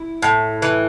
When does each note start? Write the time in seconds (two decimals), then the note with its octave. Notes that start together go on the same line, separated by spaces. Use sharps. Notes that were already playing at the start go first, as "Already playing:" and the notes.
Already playing: E4
0.22 A2
0.62 E3